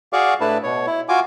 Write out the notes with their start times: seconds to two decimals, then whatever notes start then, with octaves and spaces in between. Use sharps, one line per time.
0.13 F#4 G#4 D5 F5 C#6 D6
0.41 A2 A3 D4 E4 B4 A5
0.63 B2 C#5
0.87 E4
1.09 F4 F#4 G#5 D6